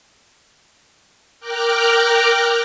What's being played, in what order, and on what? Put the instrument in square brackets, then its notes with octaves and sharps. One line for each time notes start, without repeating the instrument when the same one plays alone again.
[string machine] A#4 G5 A#5 D6 F6 F#6